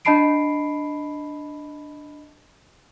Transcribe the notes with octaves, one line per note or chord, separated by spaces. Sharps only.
D4 D#5 A5 B5 C7 D7